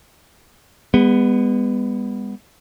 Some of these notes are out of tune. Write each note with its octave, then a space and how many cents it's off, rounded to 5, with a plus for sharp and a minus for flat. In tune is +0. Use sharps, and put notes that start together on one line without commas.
G#3 -45 B3 +0